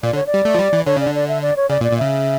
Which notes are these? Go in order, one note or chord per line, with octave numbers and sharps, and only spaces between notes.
A#2 D5
D3 C#5
D5
G3
A3
F3
G3
E3
D3 C#5
C#3 D5
D3
D5
E5
D5
C#5
C#3 D5
A#2
D5
A#2
C#3 E5